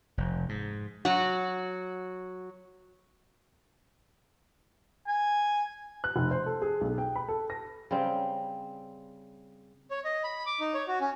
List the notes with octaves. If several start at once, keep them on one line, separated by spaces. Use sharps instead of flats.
F1
G#2
F#3 F#4
G#5
F#6
F1
C5
A4
G#4
B1
G5
B5
A4
A#6
C#3 G3 C4
C#5
D#5
B5
D6
D#4
C#5
F#4
C#4